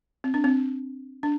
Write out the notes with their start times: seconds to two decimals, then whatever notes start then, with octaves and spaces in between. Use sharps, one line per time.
0.24 C4
0.34 D4
0.44 C4
1.23 D4